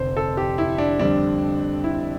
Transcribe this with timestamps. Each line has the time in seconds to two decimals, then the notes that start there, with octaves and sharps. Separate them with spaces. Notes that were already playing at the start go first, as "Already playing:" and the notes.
Already playing: F1 F2 D3 C5
0.17 A4
0.37 G4
0.58 E4
0.78 D4
0.99 F2 D3 G3 C4 D4
1.84 E4